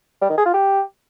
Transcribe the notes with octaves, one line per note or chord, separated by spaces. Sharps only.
G3
D#3
G#4
F4
G4